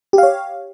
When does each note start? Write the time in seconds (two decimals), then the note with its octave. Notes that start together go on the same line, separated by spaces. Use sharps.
0.13 G4
0.18 F5
0.23 C#5